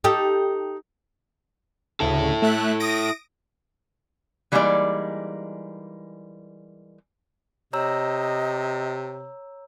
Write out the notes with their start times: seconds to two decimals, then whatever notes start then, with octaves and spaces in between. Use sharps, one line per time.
0.04 D#4 G4 A4
2.00 D2 C#3 E4 A4
2.42 A3 E5 F#6
2.80 D#6 A#6 D7
4.52 E3 G3 G#3 A#3 D#4 D5
7.73 C3 C#5 D#5 A#5 E6